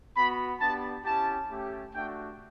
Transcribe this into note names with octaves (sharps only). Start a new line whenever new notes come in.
B3 F#4 B5
B3 D4 G4 A5
C#4 E4 G4 A5
A3 C#4 G4
A3 D4 F#4 G5